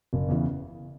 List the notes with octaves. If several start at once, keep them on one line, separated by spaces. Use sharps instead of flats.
F#1
E2 C#3 E3